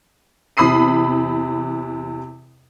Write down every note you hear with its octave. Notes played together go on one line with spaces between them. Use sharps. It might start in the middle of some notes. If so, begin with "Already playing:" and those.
E2 C3 B5 D#6 C7 D#7